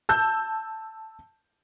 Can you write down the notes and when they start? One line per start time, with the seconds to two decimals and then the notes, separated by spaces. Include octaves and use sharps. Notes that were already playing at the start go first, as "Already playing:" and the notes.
0.09 A5 E6 G6